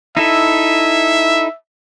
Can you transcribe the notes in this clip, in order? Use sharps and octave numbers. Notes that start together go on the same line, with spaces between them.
D#4 E4 A4 E5